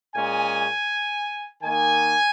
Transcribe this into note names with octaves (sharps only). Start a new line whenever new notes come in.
A#2 G#3 C#4 G#5
D#3 A#3 D#4 G#5